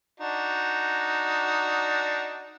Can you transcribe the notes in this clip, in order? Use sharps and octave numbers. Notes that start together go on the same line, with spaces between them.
D4 D#4 F#4